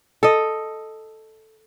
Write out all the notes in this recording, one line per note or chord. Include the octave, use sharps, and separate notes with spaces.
A4 D#5